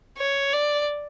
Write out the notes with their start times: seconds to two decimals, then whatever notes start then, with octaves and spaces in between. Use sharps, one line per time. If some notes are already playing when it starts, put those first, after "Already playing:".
0.18 C#5
0.53 D5